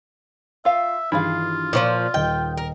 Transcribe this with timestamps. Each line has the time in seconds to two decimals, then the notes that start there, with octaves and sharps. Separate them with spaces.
0.65 F4 E5 F5
1.12 G2 D#3 E3 E4 F4 G#4 F5
1.73 A#2 D#3 F3 C#5 C#6 D#6
2.14 D#1 D#5 G5
2.57 A#4